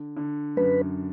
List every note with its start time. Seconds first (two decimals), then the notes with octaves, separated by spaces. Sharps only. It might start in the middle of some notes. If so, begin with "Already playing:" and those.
Already playing: D3
0.17 D3
0.57 F#2 B4